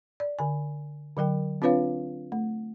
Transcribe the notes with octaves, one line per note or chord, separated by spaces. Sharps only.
D5
D3 G#5
D3 F#3 A#4 G5
C4 D4 F4 B4 C#5 F5
A3